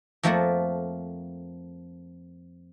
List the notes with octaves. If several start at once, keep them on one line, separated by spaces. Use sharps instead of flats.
F2 F3 A3 A#3 A#4 F#5